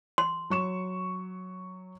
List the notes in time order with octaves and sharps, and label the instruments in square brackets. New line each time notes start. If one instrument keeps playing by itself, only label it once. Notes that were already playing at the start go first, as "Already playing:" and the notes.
[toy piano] C6
[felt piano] F#3 C#6 E7